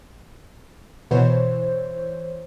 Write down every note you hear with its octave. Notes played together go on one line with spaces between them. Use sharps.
B2 E3 C5 C#5